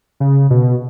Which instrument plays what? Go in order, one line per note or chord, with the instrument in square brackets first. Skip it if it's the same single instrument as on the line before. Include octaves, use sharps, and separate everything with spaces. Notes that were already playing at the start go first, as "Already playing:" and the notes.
[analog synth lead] C#3
B2